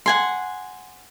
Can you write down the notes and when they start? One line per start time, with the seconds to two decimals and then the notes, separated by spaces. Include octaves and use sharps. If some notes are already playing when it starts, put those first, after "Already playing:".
0.06 F#5 G#5 C6